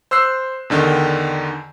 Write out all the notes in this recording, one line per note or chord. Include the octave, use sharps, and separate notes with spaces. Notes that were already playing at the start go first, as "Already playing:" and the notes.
C5 E6 F#6 C7
E2 D3 D#3